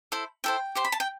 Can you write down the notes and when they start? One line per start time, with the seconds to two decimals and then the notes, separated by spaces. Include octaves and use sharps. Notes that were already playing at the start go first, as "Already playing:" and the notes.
0.12 E4 A4 C5
0.44 E4 A4 C5 G5
0.75 G4 C5 C6
0.85 B5
0.92 A5
1.00 G5